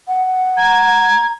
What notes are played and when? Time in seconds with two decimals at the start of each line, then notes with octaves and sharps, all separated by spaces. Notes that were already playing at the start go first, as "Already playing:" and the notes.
0.08 F#5
0.57 A#5 G#6